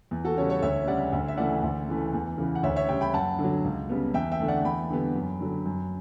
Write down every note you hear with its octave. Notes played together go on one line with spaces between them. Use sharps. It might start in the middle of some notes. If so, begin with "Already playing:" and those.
E2
F#4 A4
C#3 G3 A4 C#5
A4 C#5
D2 C#5 E5
C#3 G3 D5 F#5
D2
E5
C#3 E3 A3 D5 F#5
D2
C#3 E3 A3
E2
C#3 E3
F#5
D2 C#5 E5
C#5 E5
C#3 G3 E5 G5
G5 B5
F#2 F#5 A5
D3
F#3
C#2
C#3 G3 B3
E2 E5 G5
E5 G5
D3 A3
D5 F#5
E2 G5 B5
D3 G3 B3
F#2
D3 F#3
F#2